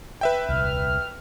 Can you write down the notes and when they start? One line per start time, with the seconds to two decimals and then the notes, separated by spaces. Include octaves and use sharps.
0.21 B4 E5 G5
0.49 D#1 C2 F6